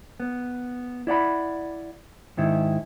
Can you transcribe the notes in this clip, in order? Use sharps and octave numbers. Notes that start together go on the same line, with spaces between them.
B3
E4 D5 F#5 B5
G#2 D#3 E4